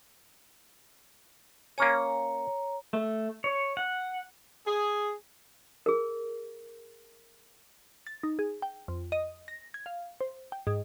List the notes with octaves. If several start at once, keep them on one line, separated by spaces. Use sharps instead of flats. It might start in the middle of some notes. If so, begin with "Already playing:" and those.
A#3 C#4 C#5 G#5 A#5
A3
C#5
F#5
G#4
G#4 A#4
A6
D#4
G#4
G5
F2
D#5
A#6
G#6
F5
C5
G5
G#2